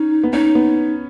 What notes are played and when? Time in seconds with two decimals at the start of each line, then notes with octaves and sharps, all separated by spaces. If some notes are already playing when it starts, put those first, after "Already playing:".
Already playing: C#4 D#4
0.24 B3
0.33 C#4 D#4
0.55 B3